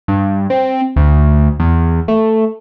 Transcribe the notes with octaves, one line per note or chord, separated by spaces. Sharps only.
G2
C4
D2
E2
A3